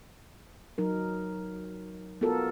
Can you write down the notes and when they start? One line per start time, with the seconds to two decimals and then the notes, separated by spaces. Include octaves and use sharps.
0.78 F#3 D#4 A#4
2.21 B3 F4 F#4 A4 A#4